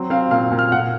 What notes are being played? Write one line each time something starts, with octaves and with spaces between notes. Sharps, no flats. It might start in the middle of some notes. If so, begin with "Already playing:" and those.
Already playing: F#3 C4
C4 F5
A#2 F5
A#2
F6
A#2 F#5